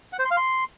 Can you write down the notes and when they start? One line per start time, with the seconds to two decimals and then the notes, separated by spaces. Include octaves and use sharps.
0.13 F#5
0.19 C5
0.25 C6
0.31 F5
0.37 C6